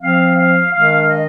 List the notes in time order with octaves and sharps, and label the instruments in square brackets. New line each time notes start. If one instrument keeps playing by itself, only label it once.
[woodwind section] F3 C4 F5
F5
D#3 G#3 D4 F5
D#5